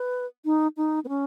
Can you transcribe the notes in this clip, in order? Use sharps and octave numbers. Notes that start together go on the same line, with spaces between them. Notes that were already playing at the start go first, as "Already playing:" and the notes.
Already playing: B4
D#4
D#4
B3
C#4